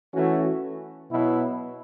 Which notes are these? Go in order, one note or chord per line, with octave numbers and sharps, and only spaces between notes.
E3 A3 C#4 F#4
B2 F#3 B3 E4